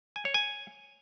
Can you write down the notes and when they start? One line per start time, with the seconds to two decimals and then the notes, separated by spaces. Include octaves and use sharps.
0.16 G#5
0.25 C#5
0.34 G#5